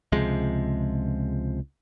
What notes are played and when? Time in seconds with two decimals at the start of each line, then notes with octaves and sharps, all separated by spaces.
0.12 C#2 C3 F3 G#3